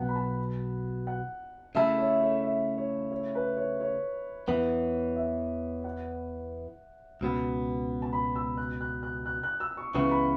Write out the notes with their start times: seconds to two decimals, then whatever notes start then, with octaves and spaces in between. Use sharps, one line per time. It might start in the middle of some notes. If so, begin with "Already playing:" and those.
Already playing: B1 B2 B3 F#5 A5
0.09 B5
0.16 A5
1.07 F#5
1.75 C#3 A3 E4 A4 E5
1.98 C#5
2.21 C#5
2.44 E5
2.78 C#5
3.12 C#5
3.35 B4
3.57 C#5
3.81 C#5
4.48 E2 E3 B3
5.16 E5
5.84 F#5
7.21 C#2 B2 B3
8.02 A5
8.13 B5
8.35 E6
8.57 F#6
8.81 F#6
9.03 F#6
9.26 F#6
9.43 F#6
9.60 E6
9.77 C#6
9.94 C#2 C#3 E3 B3 C#6
10.11 B5